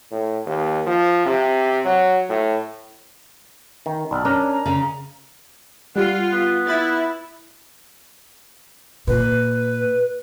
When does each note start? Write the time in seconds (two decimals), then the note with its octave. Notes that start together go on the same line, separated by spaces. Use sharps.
0.11 A2
0.46 D#2
0.86 F3
1.25 C3
1.85 F#3
2.29 A2
3.86 D#3
4.11 B1 D5
4.25 C#4 D4 A#4
4.50 A#5
4.66 C#3
5.96 G3 F4 F#5
6.32 B3
6.67 E4 B5 A6
9.07 A#2 B4